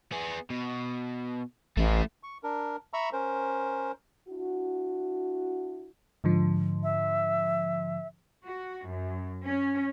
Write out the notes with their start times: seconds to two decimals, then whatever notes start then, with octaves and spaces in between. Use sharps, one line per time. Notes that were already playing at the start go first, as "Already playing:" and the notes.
0.12 B3 G#4
0.51 B2
1.77 A1 A3 E4
2.23 C#6
2.43 D4 A#4
2.93 E5 A#5 B5 C#6 E6
3.13 C#4 A#4 C5
4.28 D4 E4 F#4
6.24 G#2 D3 F3
6.83 E5
8.45 F#4
8.87 F#2
9.44 C#4